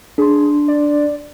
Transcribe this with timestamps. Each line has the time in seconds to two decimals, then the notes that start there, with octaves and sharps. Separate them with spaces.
0.18 D4 G#4 C6
0.68 D5